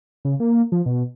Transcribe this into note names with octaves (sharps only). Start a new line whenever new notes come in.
C#3
A#3
F3
B2